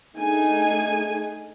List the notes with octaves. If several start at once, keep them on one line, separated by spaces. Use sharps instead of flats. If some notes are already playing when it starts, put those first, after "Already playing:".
A3 D4 D#4 G#4 G#5